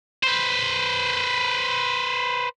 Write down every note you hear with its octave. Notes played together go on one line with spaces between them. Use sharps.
B4 C5